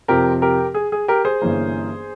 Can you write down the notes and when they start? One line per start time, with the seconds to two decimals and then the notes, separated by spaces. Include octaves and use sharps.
0.08 F2 C3 F3 C4 G4 A#4
0.42 G4 A#4
0.74 G#4
0.92 G#4
1.08 G4 A#4
1.25 G#4 C5
1.42 G1 G2 E3 A#3 C#4